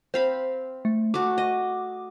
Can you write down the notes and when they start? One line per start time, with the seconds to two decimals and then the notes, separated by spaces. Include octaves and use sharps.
0.14 C4 C5 F5 B5
0.85 A3
1.14 A3 F#4 D6
1.38 D#5